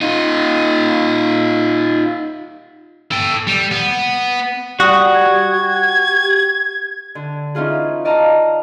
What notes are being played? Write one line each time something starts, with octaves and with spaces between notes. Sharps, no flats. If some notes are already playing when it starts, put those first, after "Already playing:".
D#4 F4
A4 G5
G3
B3
G3 F#4 D#6
G#6
G4
D3
E3 C#4 D#4 F4 G#4
D5 D#5 F5 A5 A#5